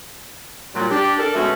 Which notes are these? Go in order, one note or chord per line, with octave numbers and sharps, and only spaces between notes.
A#2 F#3 G3
D4 G4
D4 A4 A#4
B2 G#3 A3 C#4 F#4 E5